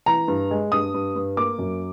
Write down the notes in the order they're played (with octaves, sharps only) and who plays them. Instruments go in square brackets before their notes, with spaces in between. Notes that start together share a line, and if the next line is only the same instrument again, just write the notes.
[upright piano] E3 A#5
G2
G#3
G2 D#6
G2
G2
A#3 D6
F#2